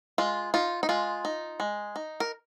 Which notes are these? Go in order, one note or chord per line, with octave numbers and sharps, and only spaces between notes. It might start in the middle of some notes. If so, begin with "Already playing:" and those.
G#3 F4
D#4 F4
D#4
G#3 F4
D#4
G#3
D#4
A#4